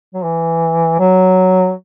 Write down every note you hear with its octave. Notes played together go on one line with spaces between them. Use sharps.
F#3
E3
F#3